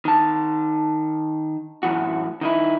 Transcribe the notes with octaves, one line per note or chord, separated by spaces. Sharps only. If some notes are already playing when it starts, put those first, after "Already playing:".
D#3 A5
F#2 A2 E3 F#4
D#3 D#4 E4